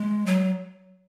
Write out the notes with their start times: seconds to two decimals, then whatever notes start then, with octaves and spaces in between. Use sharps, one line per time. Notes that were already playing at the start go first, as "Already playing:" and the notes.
Already playing: G#3
0.26 F#3